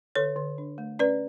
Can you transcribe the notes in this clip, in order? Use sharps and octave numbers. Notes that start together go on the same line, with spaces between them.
D3 A4 C#5
D3
D4
A3
C#4 B4 D5